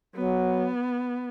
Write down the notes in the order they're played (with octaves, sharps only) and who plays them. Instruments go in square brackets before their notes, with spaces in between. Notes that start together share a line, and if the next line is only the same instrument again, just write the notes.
[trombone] F#3 [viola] B3